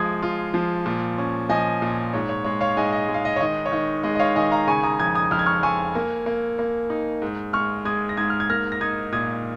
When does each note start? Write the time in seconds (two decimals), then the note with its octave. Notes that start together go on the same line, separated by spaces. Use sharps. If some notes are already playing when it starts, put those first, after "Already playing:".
Already playing: F3 G#3 D#6 G#6
0.22 F4
0.54 F3
0.86 A#2
1.18 C#4
1.49 F3 D#5 G#5
1.82 A#2
2.13 G#2 C#5
2.29 C#5
2.44 G#3 C#5
2.61 C#5 F5
2.77 G#2 D#5 G#5
2.92 D#5
3.09 G#3
3.14 F5
3.25 D#5
3.36 C#5
3.40 D#3 D#5
3.66 C#5
3.72 D#3 D#5
4.03 G#3 D#5
4.15 D#5
4.20 C#5 F5
4.36 D#3 D#5 G#5
4.52 F5 A#5
4.67 C#3 G#5 C#6
4.83 A#5 D#6
4.99 F2 D#6 G#6
5.15 D#6 G#6
5.31 F2 F6
5.39 G#6
5.46 C#6 F6
5.63 F2 G#5 C#6
5.95 A#3
6.26 A#3
6.59 A#3
6.90 D#4
7.22 G#2
7.53 G#3 C#6 F6
7.85 G#3 D#6 G#6
8.09 A#6
8.17 G#2 D#6 G#6
8.30 F6
8.40 G#6
8.49 A#3 F6 A#6
8.72 A#6
8.81 D#4 D#6 G#6
9.13 A#2 D#6 G#6